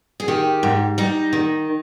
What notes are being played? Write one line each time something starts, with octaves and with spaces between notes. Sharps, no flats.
G#4
D#3 G4
G#2
G3 D#4
D#3